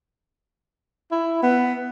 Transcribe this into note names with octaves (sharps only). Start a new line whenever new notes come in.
E4
B3